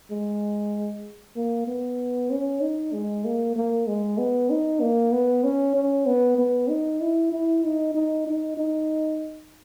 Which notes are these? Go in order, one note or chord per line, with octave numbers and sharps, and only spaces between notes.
G#3
A#3
B3
C#4
D#4
G#3
A#3
A#3
G#3
B3
D#4
A#3
B3
C#4
C#4
B3
B3
D#4
E4
E4
D#4
D#4
D#4
D#4